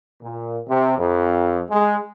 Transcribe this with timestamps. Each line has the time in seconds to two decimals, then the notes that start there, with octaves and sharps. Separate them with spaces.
0.23 A#2
0.69 C3
0.98 F2
1.71 G#3